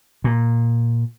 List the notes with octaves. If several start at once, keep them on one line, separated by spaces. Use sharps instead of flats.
A#2